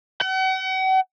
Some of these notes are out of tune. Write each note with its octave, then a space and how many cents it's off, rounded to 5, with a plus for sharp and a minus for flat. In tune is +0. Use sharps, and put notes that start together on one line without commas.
F#5 +40